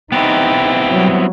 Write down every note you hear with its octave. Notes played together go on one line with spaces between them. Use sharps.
B1 B3 C4 D#4 E4 G4
F#3 G3